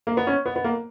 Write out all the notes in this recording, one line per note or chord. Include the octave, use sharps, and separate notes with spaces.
A#3
B3
C#4
B3
B3
A#3